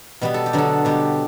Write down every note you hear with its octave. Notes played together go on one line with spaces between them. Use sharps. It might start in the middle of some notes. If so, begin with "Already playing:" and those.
B2 G3 B3 B4
A4
G4
D3 F#3 B3 A4
B2 G3 B3 G4